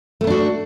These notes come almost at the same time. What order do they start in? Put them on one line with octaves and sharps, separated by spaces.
A3 B3 D4 F#4